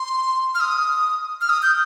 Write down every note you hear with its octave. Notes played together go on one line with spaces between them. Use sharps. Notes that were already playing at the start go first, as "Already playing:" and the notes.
Already playing: C6
F6
D#6
F6
D#6
G6